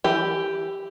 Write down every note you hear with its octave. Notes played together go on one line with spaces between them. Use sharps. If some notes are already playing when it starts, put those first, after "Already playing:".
E3 G4